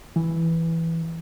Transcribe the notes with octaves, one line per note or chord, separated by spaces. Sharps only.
E3